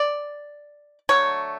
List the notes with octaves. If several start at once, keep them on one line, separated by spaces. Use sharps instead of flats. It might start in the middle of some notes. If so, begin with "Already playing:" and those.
Already playing: D5
D3 F#3 A3 C#5